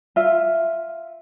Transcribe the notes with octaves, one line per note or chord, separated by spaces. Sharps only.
F4 E5